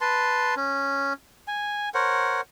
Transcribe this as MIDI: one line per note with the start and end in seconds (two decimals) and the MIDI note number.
0.01 0.55 71
0.01 0.55 81
0.01 0.55 84
0.57 1.13 61
1.48 1.89 80
1.94 2.41 70
1.94 2.41 72
1.94 2.41 73
1.94 2.41 78